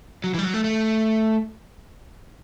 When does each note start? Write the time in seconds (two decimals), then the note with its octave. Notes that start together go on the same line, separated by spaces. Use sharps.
0.24 F#3
0.34 E3
0.39 G3
0.44 F#3
0.54 A3
0.64 A3